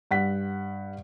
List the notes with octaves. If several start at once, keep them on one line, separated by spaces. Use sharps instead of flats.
G2 F#5 B6